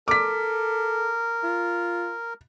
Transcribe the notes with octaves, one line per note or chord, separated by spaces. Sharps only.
A4 A#4 D6 B6
F4